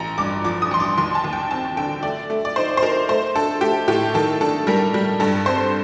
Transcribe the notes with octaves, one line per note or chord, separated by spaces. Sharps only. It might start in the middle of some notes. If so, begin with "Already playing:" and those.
Already playing: A1 A#5
G2 D6
F3 D6
D#6
A1 C6
D6
D#2 C6
A5
D#2
G5
C4 A5
D3 G5
A3 D5
A3
D5
D#4 C5
C5
D#4 A#4
A3 C5
D4 A4
A3 G4
A2 G4
D#3 A4
D4 A4
G3 A#4
G3
G2 A4
C4 C5